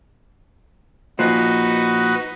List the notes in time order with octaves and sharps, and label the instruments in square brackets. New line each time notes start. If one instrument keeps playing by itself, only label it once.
[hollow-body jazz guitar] A#2 F3 [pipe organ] D#4 F#4 B4